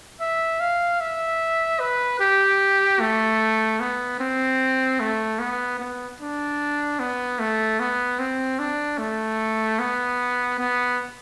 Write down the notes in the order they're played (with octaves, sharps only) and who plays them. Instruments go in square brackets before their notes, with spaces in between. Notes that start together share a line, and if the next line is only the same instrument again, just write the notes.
[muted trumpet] E5
F5
E5
B4
G4
A3
B3
C4
A3
B3
B3
D4
B3
A3
B3
C4
D4
A3
B3
B3